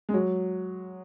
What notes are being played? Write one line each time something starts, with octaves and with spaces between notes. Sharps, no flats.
G#3
F#3